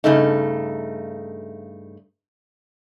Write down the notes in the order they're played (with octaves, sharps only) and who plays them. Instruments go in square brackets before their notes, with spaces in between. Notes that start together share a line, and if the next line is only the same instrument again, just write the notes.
[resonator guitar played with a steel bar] G2 C#3 A3 D#4